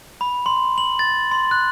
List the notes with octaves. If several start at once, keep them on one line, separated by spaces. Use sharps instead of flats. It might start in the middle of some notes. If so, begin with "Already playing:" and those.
B5
C6
F#7
A6
C6
F#6